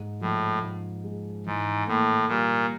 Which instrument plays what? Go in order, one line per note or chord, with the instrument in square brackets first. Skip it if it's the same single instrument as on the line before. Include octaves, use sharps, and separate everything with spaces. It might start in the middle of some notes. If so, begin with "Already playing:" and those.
Already playing: [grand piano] G#2
[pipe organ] A2 [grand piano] F3
[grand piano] G#2
G#3
[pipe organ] G#2 [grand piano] E3
[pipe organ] A2 [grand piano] A#3
[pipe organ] A#2 [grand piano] G3